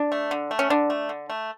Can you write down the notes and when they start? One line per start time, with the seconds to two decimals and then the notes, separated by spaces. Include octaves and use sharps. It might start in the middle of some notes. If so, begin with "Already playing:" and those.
Already playing: D4
0.12 A3
0.31 D3
0.51 A3
0.59 C#4
0.70 D3 D4
0.90 A3
1.09 D3
1.30 A3